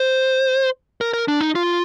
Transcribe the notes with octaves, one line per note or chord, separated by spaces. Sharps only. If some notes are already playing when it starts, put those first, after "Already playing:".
Already playing: C5
A#4
A#4
D4
D#4
F4